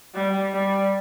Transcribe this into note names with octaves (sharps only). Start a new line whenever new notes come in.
G3
G3